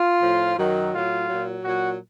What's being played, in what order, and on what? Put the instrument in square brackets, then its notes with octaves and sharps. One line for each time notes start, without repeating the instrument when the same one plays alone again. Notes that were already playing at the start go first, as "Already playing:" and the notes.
Already playing: [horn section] F4
A2 F3
F#2 D#3 F#3
A2 F#3 F4
A#2 F#3
A#2 F#3 F#4